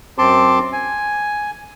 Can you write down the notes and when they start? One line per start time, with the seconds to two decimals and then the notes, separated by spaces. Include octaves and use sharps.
0.18 F#2 C4 A5 C6 D6
0.72 G#5